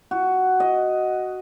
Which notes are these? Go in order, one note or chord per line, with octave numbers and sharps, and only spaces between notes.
F#4
D#5